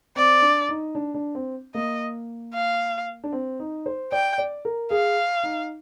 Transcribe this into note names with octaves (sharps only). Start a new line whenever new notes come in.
C4 D5
D4
D#4
D4
D4
C4
A#3 D#5
F5
D4
C4
D#4
C5
D5 G5
D5
A#4
G#4 F5
D#4